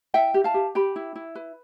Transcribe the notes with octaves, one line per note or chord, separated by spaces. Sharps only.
E4 E5 G5
G4
F5 A5
G4
G4 G5 B5
E4
E4
B4